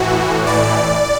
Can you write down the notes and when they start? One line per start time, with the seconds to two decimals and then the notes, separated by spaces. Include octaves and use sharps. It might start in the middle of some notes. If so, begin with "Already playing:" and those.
Already playing: A2 E3 F#4
0.47 D5